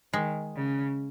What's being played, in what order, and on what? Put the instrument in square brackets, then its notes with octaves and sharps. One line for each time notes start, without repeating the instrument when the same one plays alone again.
[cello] D#3 [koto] G#3
[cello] C#3